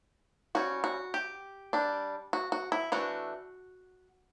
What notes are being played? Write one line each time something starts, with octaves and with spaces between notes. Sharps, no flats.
G3 C#4 F#4
F#4
G4
G3 D4
F#4
F#4
E4
E3 A3 D4 F#4